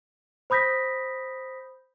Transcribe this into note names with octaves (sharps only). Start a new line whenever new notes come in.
C5 B5 D#6 G6 A#6 B6